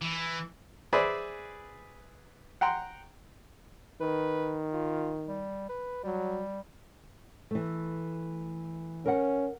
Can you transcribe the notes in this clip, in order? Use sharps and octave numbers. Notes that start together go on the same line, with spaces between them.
E3
G#4 B4 C5 D5 E5 G#5
F#5 G5 A#5 C6
D#3 B4
F4
G3
B4
F#3 G3
E3 A3
C#4 A#4 F#5